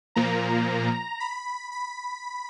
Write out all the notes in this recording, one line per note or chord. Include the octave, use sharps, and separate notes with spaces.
A#2 F3 A#3 A#5
B5
B5